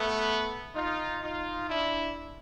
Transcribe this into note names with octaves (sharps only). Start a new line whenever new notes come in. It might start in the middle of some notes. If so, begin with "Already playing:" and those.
Already playing: A3 B3
D#4 F4
D#4 F4
D4 E4